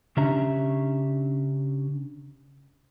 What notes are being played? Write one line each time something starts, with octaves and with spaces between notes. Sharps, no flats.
C#3 C#4 D4 G4 E5 A#5